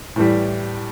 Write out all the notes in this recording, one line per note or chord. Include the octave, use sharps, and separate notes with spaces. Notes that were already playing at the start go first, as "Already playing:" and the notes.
A2 E3 G3